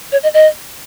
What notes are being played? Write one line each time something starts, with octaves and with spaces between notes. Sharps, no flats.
C#5
D#5
D#5